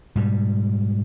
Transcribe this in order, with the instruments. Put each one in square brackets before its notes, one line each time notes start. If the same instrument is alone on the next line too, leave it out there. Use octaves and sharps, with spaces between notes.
[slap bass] G#2 B2 G3